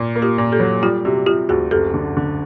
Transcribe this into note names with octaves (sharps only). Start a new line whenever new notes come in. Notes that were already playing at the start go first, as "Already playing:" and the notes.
Already playing: A#2
A#3
F4 G4
A#2
G4 A4
F#3
G3 F4 G4
C3 F#4
C3 F4 G4
D2 F#4 G#4
F#1 G4 A4
D3
D3